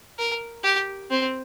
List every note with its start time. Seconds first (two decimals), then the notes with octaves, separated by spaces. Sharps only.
0.19 A#4
0.64 G4
1.10 C4